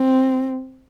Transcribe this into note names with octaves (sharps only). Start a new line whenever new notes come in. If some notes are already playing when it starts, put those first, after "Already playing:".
Already playing: C4